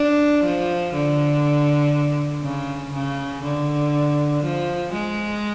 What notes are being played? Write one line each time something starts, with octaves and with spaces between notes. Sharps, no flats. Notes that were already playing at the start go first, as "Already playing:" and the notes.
Already playing: D4
F3
D3
C#3
C#3
D3
F3
G#3